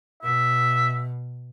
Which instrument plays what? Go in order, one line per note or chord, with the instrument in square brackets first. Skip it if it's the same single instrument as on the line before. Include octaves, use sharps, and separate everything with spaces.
[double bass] B2 [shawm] E5